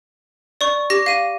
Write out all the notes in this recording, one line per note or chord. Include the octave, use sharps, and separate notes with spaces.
D5 C#6
G4 A#6
F5 D#7